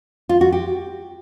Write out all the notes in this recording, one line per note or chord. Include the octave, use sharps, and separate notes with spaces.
F4
F#4
G4